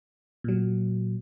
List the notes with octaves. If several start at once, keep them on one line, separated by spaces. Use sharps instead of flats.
A#2 F#3